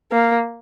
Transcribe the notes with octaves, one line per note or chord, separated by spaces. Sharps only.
A#3